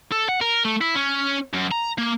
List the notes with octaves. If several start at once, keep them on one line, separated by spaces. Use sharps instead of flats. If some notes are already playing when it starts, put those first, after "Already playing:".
A4
F#5
A#4
A3
E4
C#4
F#2
A#5
A#3